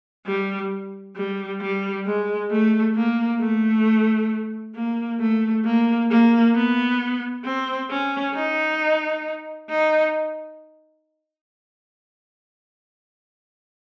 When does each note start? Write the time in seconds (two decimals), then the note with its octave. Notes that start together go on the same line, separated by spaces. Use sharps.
0.26 G3
1.16 G3
1.60 G3
2.06 G#3
2.50 A3
2.96 A#3
3.40 A3
4.75 A#3
5.19 A3
5.64 A#3
6.10 A#3
6.54 B3
7.45 C4
7.90 C#4
8.34 D#4
9.70 D#4